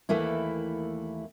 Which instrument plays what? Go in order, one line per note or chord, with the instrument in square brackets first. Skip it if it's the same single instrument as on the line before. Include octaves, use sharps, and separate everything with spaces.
[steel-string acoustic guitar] D#2 E3 A3 A#3 E4